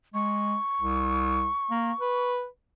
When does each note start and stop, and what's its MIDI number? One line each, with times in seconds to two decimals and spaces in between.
0.14 0.57 56
0.14 2.31 85
0.81 1.48 36
1.71 1.92 58
2.00 2.46 71